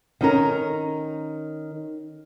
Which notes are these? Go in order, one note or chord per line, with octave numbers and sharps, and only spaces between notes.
D#3 C#4 A#4